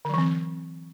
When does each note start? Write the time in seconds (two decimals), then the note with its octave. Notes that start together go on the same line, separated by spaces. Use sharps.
0.05 D3
0.09 F#3
0.14 E3
0.18 C4